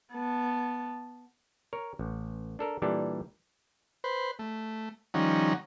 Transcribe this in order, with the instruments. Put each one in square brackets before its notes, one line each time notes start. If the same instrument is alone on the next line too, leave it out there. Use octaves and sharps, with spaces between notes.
[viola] B3 A5
[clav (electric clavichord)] A#4 C#5
A1
D4 A4 A#4
A#2 E3 G3 D4 G4 A4
[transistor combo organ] B4 C5
A3
D#3 F3 G3 C#4 D#4 F#5